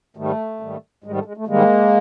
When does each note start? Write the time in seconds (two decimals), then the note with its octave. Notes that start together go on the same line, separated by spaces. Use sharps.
0.16 G#2 D#3 G3 A3
0.60 G#2 D#3 G3
1.04 G#2 D#3 G3 G#3
1.16 A3
1.25 G#3
1.37 A3
1.47 G#2 D#3 G3 G#3 A#3